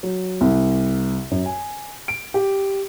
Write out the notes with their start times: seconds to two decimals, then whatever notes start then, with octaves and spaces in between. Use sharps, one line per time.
0.03 F#3
0.41 C2
1.31 F#2
1.46 G#5
2.08 D7
2.34 G4